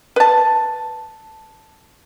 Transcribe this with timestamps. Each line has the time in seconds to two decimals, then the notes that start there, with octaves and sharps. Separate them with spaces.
0.16 B4 A5